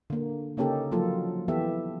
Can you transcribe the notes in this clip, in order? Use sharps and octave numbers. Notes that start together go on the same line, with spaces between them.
D3 A#3
C#3 A#3 C#4 D#4 G4 A4
F3 F#3 A#3 F4 A4
E3 B3 G4 A4 E5